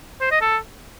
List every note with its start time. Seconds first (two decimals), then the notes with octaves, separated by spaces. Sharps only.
0.21 C5
0.31 D#5
0.41 A4